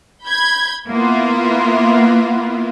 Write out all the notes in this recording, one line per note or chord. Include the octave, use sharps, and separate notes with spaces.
B5 G6 G#6
A#3 B3 E4 F4